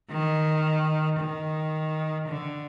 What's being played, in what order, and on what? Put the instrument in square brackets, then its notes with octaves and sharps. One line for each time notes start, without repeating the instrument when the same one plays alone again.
[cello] D#3
D#3
D3